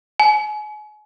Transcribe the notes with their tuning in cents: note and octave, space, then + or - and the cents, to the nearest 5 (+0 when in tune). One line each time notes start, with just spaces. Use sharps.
G#5 +35